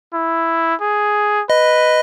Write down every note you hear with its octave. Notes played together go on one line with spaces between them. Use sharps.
E4
G#4
B4 D#5